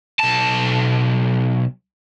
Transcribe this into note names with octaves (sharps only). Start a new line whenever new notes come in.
B1 A5